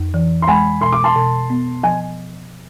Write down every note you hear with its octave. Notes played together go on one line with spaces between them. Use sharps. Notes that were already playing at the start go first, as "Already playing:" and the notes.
Already playing: F2
E3
C6
G#3 G#5 B5
B2 C6
D6
A5 C6
B2
B3
F3 G#5